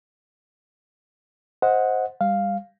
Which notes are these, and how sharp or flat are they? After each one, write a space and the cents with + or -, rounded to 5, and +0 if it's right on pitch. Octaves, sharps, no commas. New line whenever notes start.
C5 +0 D#5 +20 F#5 -10
G3 +30 F5 +0